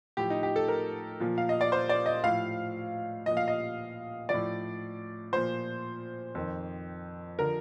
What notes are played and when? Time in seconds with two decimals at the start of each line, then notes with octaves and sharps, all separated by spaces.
0.17 A2 F3 G4
0.30 D#4
0.43 G4
0.56 A4
0.68 A#4
1.20 A#2 F3
1.38 F5
1.49 D#5
1.61 D5
1.72 C5
1.89 D5
2.06 D#5
2.23 A2 F3 F5
3.26 A#2 F3 D#5
3.37 F5
3.48 D#5
4.29 A2 F3 D5
5.32 A#2 F3 C5
6.35 F2 D#3
7.39 D3 F3 A#4